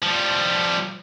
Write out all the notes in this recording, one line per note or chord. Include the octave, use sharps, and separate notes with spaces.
F3 G3